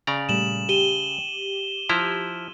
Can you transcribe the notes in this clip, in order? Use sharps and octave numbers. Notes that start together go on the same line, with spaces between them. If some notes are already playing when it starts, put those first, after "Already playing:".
C#3 D5 A#5
A#2 G3 A3 E7 F#7
G4 D#7 E7 G7
F3 E4 A#5